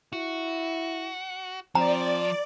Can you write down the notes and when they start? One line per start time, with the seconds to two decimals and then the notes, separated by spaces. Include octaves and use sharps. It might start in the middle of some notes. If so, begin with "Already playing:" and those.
0.13 E4 F#4
1.75 F3 C4 D5 A#5